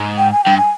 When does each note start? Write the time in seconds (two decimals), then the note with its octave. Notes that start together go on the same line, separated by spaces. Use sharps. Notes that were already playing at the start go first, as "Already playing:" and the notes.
Already playing: G#2
0.18 G5
0.32 G#5
0.44 G2 G5
0.58 G#5